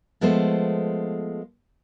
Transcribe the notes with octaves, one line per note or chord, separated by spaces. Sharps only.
F3 G#3 A3 B3 A4 C5